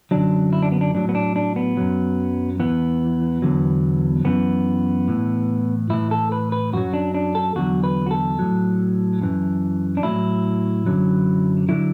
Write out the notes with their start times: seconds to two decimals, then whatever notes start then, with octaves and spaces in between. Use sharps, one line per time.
0.11 F#2 D3 F#3 D4
0.53 E4
0.63 D4
0.72 B3
0.81 D4
0.95 A2 F#3 D4
1.09 B3
1.15 D4
1.36 D4
1.56 B3
1.77 F#2 F#3
2.60 E2 E3 B3
3.42 E2 D3 F#3
4.25 F#2 E3 B3
5.08 A2 E3
5.90 A2 E3 E4
6.11 A4
6.32 B4
6.52 B4
6.73 F#2 F#3 F#4
6.94 D4
7.14 D4
7.35 A4
7.55 E2 D3 F#3 F#4
7.84 B4
8.07 F#4
8.11 A4
8.39 A2 F#3
9.21 F#2 E3
9.97 D4
10.03 A2 F#3 E4
10.86 F#2 D3 F#3
11.69 D3 F#3 E4